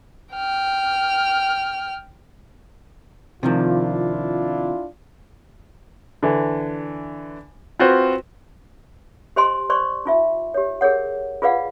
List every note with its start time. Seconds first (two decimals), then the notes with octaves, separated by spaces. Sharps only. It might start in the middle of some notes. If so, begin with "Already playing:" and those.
0.34 G5 F6
3.43 C3 D#3 F3 D4 E4 F4
6.23 D3 E3
7.80 C4 F4 F#4 B4 C5
9.36 G4 C5 D#5 G#5 C6
9.70 C5 D5 C6 C#6
10.05 D#4 F4 E5
10.54 G4 C#5
10.81 G#4 A#4 C#5 F#5
11.42 F4 G#4 B4 D5 F5 F#5